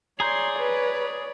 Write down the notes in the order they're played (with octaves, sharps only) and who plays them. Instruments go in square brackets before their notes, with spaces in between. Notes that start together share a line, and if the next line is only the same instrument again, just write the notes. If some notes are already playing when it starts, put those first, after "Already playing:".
[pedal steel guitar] G#4 A#5 G6 [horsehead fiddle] C#5 D5 [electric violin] C6
[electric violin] B4